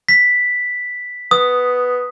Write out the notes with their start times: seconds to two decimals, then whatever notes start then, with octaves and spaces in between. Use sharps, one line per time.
0.09 B6
1.31 B3 D#6